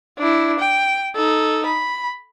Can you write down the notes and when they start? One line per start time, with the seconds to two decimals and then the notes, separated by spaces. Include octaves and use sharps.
0.18 D4 E4
0.60 G5
1.16 D#4 A4
1.66 B5